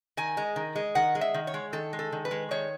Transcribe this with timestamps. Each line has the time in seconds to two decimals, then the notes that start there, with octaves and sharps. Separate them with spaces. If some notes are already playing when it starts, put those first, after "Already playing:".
0.17 D#3 G#5
0.37 G#3
0.56 D#3
0.76 G#3
0.95 D#3 F#5
1.15 G#3
1.21 E5
1.34 D#3
1.47 C#5
1.54 G#3
1.73 D#3 A4
1.93 G#3
1.99 A4
2.12 D#3
2.25 B4
2.31 G#3
2.51 D#3 C#5